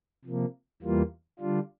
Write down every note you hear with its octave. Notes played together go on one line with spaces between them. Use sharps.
C3 F3 A#3
E2 E3 G3 A#3 F4
D3 G3 D4 F4